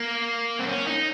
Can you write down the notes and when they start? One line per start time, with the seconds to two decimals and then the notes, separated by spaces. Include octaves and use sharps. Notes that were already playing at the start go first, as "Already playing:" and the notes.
Already playing: A#3
0.59 C4
0.67 C#4
0.87 D#4